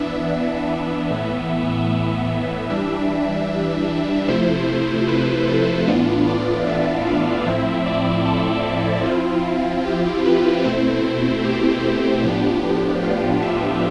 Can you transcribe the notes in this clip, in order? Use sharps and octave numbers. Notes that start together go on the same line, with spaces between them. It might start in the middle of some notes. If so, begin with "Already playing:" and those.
Already playing: E3 B3 D4 E5
A2 E3 B3
E3 G3 D4 E5
C3 F3 A3 E4 C5
B4
A4
A2 E3 B3 D4 F4
D5
E5
F5
A2 F3 C4 E4 E5
D5
A4
F3 C4 E4 F4
G4
B4
B2 A3 C4 E4 C5
G4
A2 F3 B3 D4
F4
E5